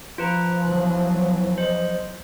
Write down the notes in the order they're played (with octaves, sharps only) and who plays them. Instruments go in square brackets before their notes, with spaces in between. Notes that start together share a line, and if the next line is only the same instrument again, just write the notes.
[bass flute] F3 [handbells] F4 B4 A#5
[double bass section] B1 E3 F#3 [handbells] F#6
[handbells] C5 D#5